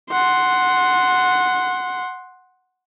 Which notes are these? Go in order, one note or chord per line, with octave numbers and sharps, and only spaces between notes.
F#5 C6